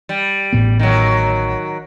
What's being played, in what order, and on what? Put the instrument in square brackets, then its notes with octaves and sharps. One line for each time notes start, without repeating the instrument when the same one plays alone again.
[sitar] G3
[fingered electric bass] A1 A2 B3
[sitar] D#3 F#3